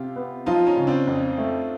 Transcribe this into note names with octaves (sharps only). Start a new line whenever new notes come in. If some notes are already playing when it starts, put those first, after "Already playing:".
Already playing: C3 F4 G4
B3
F3 D#4 F4
C#4 D#4
C#3
C4 D4
F2
A3